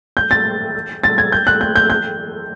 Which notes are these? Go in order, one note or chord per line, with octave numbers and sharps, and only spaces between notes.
G6
A6
A6
G#6
G6
F#6
G6
G6
G6